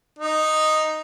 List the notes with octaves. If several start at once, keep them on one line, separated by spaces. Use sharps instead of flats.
D#4